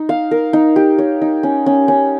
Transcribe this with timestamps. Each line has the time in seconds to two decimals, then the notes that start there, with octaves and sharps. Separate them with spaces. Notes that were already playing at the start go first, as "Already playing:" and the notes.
Already playing: D#4
0.09 F5
0.31 A#4
0.53 D#4
0.76 G4
0.98 C#5
1.22 D#4
1.43 C#4
1.66 C#4
1.88 C#4